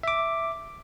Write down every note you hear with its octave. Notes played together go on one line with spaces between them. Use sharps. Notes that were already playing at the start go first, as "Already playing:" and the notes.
E5 D6